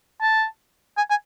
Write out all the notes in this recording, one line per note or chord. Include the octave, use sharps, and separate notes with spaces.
A5
G#5
G#5